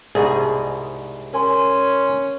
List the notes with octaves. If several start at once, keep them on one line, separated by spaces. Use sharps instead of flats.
C2 G#2 B2 G#4
C#4 A#4 G#5 C6